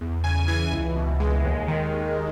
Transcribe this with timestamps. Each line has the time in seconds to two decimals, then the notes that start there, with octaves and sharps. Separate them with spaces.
0.01 E2
0.24 C#3 G#5
0.48 E3 G#5
0.72 C#2
0.96 B2
1.20 G#3
1.44 D#2
1.68 D#3